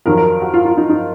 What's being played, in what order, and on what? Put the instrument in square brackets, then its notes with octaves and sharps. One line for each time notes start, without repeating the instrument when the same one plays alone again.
[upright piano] F2 D#3 F#3 A#4
A#4
F#4
F4
F4
D#4
D#4